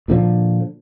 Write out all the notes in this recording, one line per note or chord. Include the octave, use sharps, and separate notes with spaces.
A#2 D3 F3